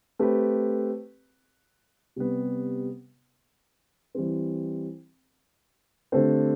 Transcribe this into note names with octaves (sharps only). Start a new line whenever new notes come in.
A3 C4 G4 B4
C3 G3 B3
E3 G3 C4
D3 A3 C4 G4 C5